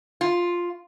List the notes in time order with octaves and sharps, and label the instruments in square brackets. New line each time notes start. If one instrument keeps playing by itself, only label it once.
[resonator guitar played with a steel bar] F4